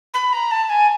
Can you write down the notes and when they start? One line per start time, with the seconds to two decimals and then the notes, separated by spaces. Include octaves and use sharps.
0.13 B5
0.32 A#5
0.51 A5
0.69 G#5